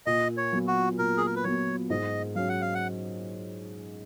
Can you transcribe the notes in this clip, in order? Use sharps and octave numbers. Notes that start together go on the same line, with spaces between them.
A#2 D#5
C#5
F#3 B3
F#4
A#2 A#4
G#4
A#4
B4
F#3 B3 C#5
G#2 D#5
F#3 C#4 F5
F#5
F5
F#5